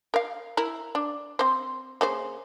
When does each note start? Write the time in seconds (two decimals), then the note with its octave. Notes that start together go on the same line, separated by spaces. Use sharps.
0.14 A#4 F5
0.57 E4 A#4
0.95 D4
1.39 C4 C5
2.01 C#3 A#3 C5